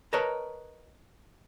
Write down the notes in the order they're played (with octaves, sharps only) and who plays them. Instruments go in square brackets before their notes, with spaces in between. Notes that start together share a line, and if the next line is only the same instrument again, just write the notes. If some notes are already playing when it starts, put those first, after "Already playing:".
[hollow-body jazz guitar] A#4 B4 C#5 D#5 A5 A#5